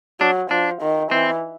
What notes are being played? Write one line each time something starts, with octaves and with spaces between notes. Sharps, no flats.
F#3 D4
F3 D4
D#3
E3 C4